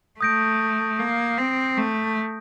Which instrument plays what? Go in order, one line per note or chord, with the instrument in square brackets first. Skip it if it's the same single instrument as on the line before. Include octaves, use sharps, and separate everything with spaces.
[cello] A3 [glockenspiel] D#6 G6 A#6 D7
[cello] A#3
C4
A3